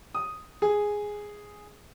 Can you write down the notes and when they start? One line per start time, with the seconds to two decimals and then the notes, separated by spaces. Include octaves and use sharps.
0.15 D#6
0.62 G#4